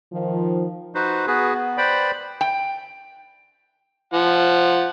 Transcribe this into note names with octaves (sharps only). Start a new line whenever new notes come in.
D#3 F3
D#4 F#4 B4 C5
B3 F#4 G#4 B4
B3
B4 C5 D5 G5 B5
G5
F3 F#5